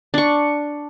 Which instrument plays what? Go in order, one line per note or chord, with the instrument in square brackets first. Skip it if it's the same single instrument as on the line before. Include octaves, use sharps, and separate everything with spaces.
[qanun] D4 C#6